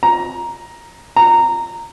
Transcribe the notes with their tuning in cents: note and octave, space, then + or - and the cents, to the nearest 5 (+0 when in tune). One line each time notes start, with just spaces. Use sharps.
A#5 +10
A#5 -15